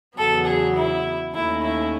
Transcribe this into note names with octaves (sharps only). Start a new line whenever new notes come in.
E2 C#3 F#3 B3 A4
G#4
E4
D#2 D#3 A3 C#4 E4
E4